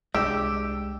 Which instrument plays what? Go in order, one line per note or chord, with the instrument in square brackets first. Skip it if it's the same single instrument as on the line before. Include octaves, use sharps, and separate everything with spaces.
[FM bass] C2 [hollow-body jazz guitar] G#3 D4 [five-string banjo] G4 [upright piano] E6